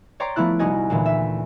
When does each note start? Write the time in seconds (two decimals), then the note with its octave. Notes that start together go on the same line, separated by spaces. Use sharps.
0.20 C#5 D5 G5 A#5 C6 D6
0.36 F3 A3 B3 E4 F#6
0.59 C2 D#4 F#4 D#5 G#5
0.90 D2 A#2 E3
1.06 E5